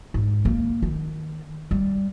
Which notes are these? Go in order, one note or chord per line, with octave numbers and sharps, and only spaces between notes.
G#2
A#3
D#3
G3